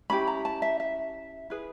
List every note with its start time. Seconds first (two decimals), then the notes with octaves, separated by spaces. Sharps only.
0.10 C#4 E4 G4 B5
0.27 A#5
0.45 A5
0.62 E5
0.80 E5
1.50 E4 G#4 B4